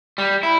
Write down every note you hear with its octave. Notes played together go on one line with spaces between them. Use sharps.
G3
E4